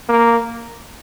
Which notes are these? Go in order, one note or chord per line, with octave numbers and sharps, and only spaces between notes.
A#3